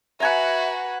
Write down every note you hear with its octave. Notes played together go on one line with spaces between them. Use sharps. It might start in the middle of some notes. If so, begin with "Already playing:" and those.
F#4 B4 E5 F#5 G#5 A#5